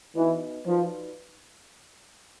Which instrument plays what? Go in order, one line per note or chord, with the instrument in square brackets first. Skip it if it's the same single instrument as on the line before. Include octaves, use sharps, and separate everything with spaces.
[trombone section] E3 [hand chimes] B3 D#4 F#4 B4 D#5
[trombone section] F3 [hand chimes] D#4 F#4 B4 D5